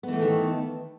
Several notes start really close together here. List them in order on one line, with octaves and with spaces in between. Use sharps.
B3 E3 A3 A4 D#3